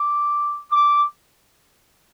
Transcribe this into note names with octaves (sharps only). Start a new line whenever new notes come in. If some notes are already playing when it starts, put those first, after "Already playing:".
Already playing: D6
D6